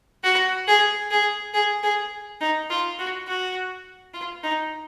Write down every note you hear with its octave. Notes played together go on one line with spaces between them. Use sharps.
F#4
G#4
G#4
G#4
G#4
D#4
F4
F#4
F#4
F4
D#4